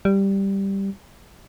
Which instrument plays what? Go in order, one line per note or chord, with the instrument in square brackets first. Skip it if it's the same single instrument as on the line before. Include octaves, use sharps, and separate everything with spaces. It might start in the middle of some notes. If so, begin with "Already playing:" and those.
[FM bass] G3